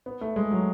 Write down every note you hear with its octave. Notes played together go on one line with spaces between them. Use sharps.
B3
A3
G#3
F#3